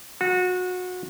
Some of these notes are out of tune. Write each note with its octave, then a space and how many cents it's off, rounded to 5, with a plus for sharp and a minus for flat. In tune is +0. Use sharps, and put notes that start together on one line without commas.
F#4 -25